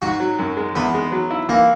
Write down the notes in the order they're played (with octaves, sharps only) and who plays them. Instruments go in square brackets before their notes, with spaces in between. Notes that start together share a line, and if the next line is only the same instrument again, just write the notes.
[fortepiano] G#2 [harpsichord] F#4
[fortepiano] F#3
F#2
G#3
[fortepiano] E2 [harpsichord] B3
[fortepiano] G#3
F#3
E4
[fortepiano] E3 [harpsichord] A#3